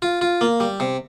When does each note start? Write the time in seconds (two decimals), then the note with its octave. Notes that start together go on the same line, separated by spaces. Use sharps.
0.02 F4
0.21 F4
0.41 A#3
0.60 G3
0.80 C3